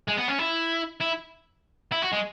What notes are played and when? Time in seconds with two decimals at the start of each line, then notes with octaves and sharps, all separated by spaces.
0.09 G#3
0.18 B3
0.28 C#4
0.39 E4
1.00 E4
1.92 E4
2.02 F#4
2.13 G#3